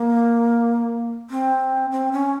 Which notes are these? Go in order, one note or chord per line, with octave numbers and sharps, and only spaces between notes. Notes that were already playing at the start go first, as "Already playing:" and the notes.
Already playing: A#3
C4
C4
C#4